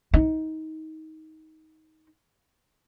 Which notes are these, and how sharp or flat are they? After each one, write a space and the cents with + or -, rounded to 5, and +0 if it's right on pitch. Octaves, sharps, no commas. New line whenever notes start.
D#4 +20